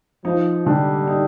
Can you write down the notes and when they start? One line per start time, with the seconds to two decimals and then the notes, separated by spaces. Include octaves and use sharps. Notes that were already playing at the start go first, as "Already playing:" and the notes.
0.25 F3 D#4
0.66 D3 G3
1.07 D#4